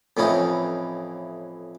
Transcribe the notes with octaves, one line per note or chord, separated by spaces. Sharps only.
F2 A2 E3 C#4 D#4